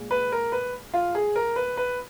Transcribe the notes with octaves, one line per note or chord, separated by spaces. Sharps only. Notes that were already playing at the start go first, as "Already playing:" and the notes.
Already playing: A#2 G#3
B4
A#4
B4
F4
G#4
A#4
B4
B4